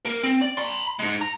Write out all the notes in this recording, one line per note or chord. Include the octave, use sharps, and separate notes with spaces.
A#3 A#4
C4
D5
B5 C6
G#3 D#4
A#5